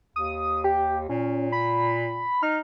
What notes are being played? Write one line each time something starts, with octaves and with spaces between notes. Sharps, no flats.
D#2 D#6
G4
A#2 C#4
B5
D#4 F6